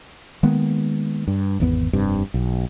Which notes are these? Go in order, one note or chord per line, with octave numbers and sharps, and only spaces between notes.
D#3 G#3 A#3 B3
G2
G#1 E2 B3
F1 G2 C3
B1